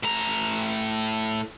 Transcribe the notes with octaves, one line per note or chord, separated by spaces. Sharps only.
A2 A#5